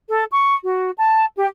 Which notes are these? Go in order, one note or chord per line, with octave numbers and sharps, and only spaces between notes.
A4
C#6
F#4
A5
G4